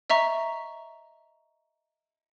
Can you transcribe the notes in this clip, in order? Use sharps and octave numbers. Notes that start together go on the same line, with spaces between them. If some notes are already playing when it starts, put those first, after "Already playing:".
D#5 E5 A#5 C#6